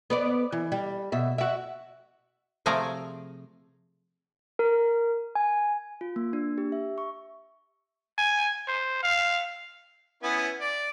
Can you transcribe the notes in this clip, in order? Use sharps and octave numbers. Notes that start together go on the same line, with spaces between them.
B3 B4 D5
E3
G3
B2 E5
F#4 E5
C3 F3 A3 G#4 D5 A#5
A#4
G#5
F4
A#3
D4
G4
E5
C#6
G#5
C5
F5
B3 C#4 E4
D5